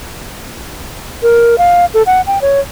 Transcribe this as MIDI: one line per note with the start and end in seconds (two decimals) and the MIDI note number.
1.23 1.58 70
1.58 1.85 77
1.94 2.03 69
2.06 2.21 78
2.27 2.41 79
2.42 2.60 73